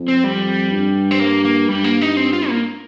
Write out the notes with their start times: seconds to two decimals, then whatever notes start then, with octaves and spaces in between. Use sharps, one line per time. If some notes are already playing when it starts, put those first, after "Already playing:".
Already playing: F2
0.08 C4
0.24 G3
0.72 G2
1.11 C4
1.20 A#3
1.45 A#3
1.69 G2 G3
1.84 A#3
2.01 D#4
2.17 C4
2.33 F4
2.49 A#3